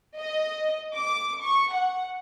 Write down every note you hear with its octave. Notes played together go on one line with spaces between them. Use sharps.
D#5
D6
C#6
F#5